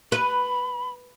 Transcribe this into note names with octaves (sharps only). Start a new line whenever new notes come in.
B4 B5